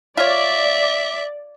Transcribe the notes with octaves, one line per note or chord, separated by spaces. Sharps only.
F4 C#5 D5 E5